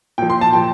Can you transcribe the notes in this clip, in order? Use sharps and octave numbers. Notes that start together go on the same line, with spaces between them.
A#2 F3 G5
C6
A5
A#2 F3 G5